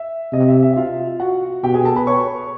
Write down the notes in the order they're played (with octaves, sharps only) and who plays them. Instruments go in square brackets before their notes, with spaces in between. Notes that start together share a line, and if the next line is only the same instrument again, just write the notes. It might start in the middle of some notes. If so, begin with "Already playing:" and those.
Already playing: [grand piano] E5
[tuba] C3 [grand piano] D#5
[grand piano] E5
E5
E5
F4 F5
F#4 F#5
[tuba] B2 [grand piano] G4 G5
[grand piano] G#4 G#5
A4 A5
B4 B5
C#5 C#6